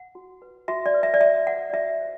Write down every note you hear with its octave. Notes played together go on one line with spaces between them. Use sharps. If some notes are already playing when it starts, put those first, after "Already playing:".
Already playing: F#5
F#4
B4
F#4 E5
D5
B4
E5
D5
F#4 E5
B4 F#5
D5
F#4 E5
C5